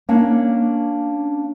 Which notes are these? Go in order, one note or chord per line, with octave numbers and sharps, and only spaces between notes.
A#3 C#4 D4